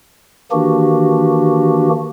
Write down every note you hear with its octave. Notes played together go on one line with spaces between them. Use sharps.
D#3 E3 A#3 D4 F#4 G4